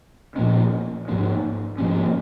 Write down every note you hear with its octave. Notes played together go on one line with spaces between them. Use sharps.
A#2 F3 A#3 C#4
G#2 F3 A#3 C#4
G#2 F3 A#3 C#4